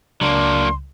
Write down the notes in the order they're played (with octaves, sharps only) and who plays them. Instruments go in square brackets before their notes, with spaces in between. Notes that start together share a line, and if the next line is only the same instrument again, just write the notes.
[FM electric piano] C#2 [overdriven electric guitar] F#3 A#3 [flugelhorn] D4 [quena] C6